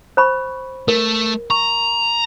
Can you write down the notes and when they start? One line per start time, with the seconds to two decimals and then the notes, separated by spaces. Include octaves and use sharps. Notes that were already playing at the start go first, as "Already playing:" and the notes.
0.17 C5 B5 C#6
0.88 A3 A#4
1.50 A#5 C#6